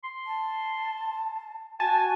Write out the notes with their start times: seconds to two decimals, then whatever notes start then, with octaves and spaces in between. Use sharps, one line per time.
0.04 C6
0.26 A5
1.80 F#4 G#5 A5